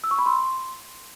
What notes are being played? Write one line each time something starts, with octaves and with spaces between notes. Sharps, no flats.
E6
C#6
B5
C6